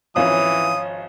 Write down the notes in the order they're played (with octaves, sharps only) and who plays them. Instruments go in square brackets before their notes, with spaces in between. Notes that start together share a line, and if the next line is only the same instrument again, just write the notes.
[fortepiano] G#1 F3 C#4 [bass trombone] E3 [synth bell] C#5 F5 [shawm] D#6